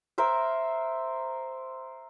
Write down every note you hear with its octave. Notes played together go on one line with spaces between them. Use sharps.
A#4 C5 E5